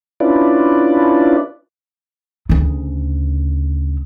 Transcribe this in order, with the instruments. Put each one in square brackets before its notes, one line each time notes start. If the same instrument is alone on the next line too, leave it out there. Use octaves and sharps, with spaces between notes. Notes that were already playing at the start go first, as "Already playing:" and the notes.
[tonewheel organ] C#4 D4 E4 F4 B4 D5
[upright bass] D2 C#3